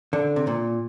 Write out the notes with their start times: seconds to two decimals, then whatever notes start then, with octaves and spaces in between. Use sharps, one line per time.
0.13 D3
0.36 C3
0.47 A#2